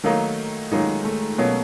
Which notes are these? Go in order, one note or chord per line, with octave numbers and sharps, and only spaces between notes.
D#3 F#3 A3 A#3 D#4
D#3 F#3 G#3 A#3 D#4
A3
B2 F#3 A#3 C#4